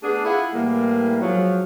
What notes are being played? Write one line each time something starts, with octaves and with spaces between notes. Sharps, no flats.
A3 B3 D4 G#4
E4 F4 G#4 E5 F#5
A2 E3 G3 A#3
G#2 F3 F#3